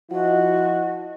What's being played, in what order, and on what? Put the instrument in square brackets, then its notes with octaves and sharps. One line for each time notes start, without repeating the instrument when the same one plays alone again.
[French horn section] F3 E4 [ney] F#4 [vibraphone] D#5 F#5